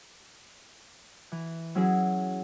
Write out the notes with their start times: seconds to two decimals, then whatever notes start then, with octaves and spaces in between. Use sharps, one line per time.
1.32 E3
1.75 F#3 C#4 E4 G#4